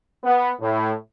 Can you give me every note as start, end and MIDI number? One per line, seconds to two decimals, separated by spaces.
0.23 0.50 59
0.60 0.93 45